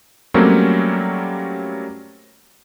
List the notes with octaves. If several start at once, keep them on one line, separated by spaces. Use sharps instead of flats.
F#3 G3 A3 A#3 C4 C#4